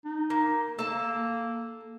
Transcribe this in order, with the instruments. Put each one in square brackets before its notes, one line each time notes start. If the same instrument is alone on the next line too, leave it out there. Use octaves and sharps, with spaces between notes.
[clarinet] D#4
[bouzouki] A#3
[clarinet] A#3 [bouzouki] A4 A5